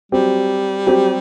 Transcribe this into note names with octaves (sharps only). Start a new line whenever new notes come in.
F#3 G3 C4 G4
F#3 C4 G4